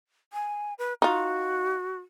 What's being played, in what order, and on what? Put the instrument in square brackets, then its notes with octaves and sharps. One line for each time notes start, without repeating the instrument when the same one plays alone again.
[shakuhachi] G#5
B4
[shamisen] D#4 F4 [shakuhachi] F#4